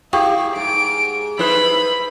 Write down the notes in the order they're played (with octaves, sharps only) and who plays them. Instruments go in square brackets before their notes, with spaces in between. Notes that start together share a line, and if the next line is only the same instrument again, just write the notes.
[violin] E4 [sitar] G4 [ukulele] G#4 F5 [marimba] G5 C#6
[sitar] G#2 [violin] D7
[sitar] D#4 E4 C5 [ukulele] G#4 B4 [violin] B5